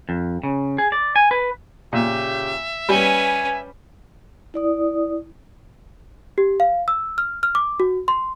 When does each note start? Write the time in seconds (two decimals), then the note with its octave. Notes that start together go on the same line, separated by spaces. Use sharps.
0.09 F2
0.43 C#3
0.78 G#4
0.92 D5
1.16 G#5
1.31 B4
1.93 A#2 C#3 G4 E5
2.89 G3 C#4 B4 G#5
4.54 E4 D5 D#6
6.38 G4
6.60 F5
6.88 E6
7.18 F6
7.43 F6
7.55 D6
7.80 F#4
8.08 C6